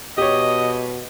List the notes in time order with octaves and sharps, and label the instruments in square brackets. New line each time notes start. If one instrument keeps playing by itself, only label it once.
[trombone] B2 [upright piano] G4 C#5 [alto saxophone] D#5